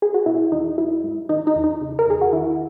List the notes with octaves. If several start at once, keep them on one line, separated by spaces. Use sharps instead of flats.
G#4
F#4
B2 E4
E2 D#4
F#3 E4
G#2
D#3 D#4
D#4
E2
D#4
C#3
A#4
E2 G#4
F#4
D#3 E4